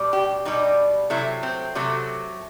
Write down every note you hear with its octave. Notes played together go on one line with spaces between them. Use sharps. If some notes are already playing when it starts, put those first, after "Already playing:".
Already playing: B2 G3
G4
B2 G3 D#4
C3 F#3 A3 E4
C4
C3 F#3 A3